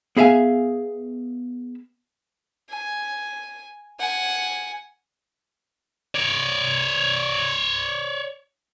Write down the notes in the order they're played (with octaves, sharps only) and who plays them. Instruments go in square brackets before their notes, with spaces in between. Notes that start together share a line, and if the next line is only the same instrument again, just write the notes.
[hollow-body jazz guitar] B3 G#4 E5 F5 G#5
[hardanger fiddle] G#5
F#5 G#5
[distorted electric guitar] C#5 D5